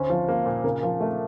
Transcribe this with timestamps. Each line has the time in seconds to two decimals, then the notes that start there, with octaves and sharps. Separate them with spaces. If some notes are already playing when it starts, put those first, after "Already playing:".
Already playing: D2 C#4 C5
0.10 F3
0.28 A#3
0.46 A#2
0.64 C#3 A#4
0.83 F3
1.01 A3